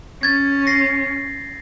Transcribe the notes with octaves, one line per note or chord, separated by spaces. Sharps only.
C#4 G#6 A6
A#6 C7